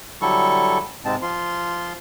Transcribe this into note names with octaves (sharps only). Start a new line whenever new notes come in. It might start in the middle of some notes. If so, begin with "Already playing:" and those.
D3 F#3 G3 E4 A4 C#6
G#2 C3 G#3 C4 A5
F3 F4 C6